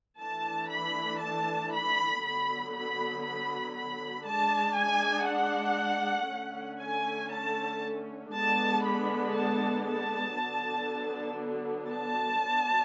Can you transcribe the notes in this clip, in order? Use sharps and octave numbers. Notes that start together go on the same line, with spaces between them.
E3 A3 D4 A5
B5
A5
B5
D3 F#3 B3 B5
B5
B5
B5
G#3 D4 A5
G#5
F#5
D3 A3 C#4
G#5
A5
D3 G#3 B3 D4 A5
B5
A5
A5
D3 F#3 B3 D4
A5
F#3 B3 D4